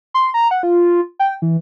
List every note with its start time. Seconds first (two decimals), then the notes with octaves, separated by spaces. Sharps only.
0.14 C6
0.34 A#5
0.51 F#5
0.63 F4
1.19 G5
1.42 E3